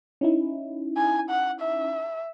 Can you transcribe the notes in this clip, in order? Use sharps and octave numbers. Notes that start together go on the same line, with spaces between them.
C#4 D#4 E4
G#5
F#5
E5